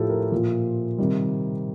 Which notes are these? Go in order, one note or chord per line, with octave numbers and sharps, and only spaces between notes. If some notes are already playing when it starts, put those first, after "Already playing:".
Already playing: A2 F3 F4 G4 A4
A#4
A#2 F3
C3 D#3 G3